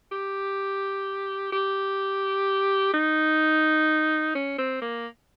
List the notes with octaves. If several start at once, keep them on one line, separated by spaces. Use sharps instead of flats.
G4
G4
D#4
C#4
C4
A#3